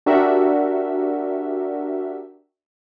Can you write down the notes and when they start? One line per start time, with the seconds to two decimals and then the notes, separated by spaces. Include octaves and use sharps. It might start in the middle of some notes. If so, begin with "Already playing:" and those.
0.06 D4 F#4 G4 A#4 E5